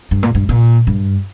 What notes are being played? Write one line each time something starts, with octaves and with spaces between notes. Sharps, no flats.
G2
A#2
G2
A#2
G2